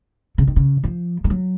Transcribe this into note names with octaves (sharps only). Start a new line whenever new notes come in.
C#3
D#3
C#3
F3
G#3
F#3